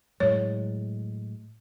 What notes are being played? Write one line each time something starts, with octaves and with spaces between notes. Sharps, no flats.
A2 F#3 G#3 C#5